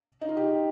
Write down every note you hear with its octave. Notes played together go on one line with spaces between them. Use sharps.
D#4
F4
G4